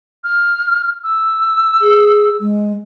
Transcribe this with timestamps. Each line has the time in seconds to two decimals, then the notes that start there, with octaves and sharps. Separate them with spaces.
0.24 F6
1.04 E6
1.81 G#4
2.41 G#3